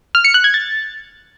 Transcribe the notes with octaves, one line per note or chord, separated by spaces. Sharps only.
F6
C#7
F#6
G#6
A6